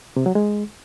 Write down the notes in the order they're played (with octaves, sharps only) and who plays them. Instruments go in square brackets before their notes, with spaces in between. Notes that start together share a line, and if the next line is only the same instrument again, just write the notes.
[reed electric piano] C3
F#3
G#3